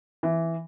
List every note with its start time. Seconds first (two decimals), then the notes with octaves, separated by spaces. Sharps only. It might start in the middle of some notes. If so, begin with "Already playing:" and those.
0.23 E3